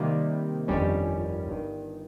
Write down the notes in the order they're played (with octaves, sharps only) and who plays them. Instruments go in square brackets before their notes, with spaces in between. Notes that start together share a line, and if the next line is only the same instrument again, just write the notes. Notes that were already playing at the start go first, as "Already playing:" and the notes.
Already playing: [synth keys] C3 D#3 G3 A#3
G1 F2 D#3 G3 C#4
G1 G2 D#3